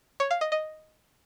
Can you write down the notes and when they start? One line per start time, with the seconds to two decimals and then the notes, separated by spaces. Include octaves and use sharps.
0.20 C#5
0.31 F5
0.41 D#5
0.52 D#5